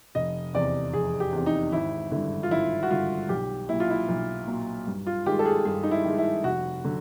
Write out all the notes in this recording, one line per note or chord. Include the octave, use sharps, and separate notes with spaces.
F1 D#5
E2 C3 D5
F1 G#4
G4
E2 C3
D#4
G#1 E4
G2 D3 E4
F4
G#1 E4
F#4
G2 D3 F4
B1 G4
A#2 F#3 E4
F4
E4
B1
A#2 F#3
G2
F4
D#3 G#3 G4
A4
G#4
G2 G#4
D#4
E4
D#3 G#3
E4
F1 F#4
D3 F#3